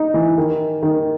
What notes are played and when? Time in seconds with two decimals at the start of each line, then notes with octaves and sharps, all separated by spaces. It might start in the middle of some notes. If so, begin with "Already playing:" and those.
Already playing: D#4
0.14 E3
0.38 D#3
0.83 D#3